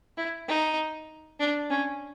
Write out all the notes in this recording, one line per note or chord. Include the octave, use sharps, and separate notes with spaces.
E4
D#4
D4
C#4